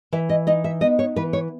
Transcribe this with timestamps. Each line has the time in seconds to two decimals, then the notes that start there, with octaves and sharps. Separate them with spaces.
0.12 E3 E5
0.29 D#5
0.47 D#4 D#5
0.64 E5
0.81 B3 D#5
0.99 C#5
1.16 E3 B4
1.33 C#5